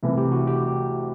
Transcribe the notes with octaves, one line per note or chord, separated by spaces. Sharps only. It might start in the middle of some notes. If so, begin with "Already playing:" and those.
C2 C3 E3 A3
G4
F#4
G4